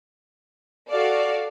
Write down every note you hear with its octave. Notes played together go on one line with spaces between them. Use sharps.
F#4 A4 D5 F5